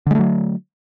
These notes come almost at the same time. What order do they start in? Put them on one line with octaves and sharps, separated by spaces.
D3 G#3 A3 F#3